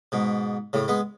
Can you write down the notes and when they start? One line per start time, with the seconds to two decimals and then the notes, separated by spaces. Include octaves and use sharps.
0.12 G#2 B2
0.73 A2 C#3
0.88 G#3 B3